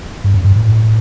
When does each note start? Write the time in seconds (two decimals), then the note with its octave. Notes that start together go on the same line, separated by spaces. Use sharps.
0.24 G2
0.34 F#2
0.44 G2
0.55 A2